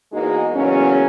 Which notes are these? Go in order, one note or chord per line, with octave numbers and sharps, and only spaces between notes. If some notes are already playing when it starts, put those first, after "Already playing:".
E2 G#2 G#3 A#3 D#4 F#4
E2 C#3 F#3 A#3 C#4